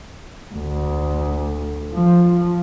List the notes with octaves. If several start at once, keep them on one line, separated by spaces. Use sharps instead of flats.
D2
F3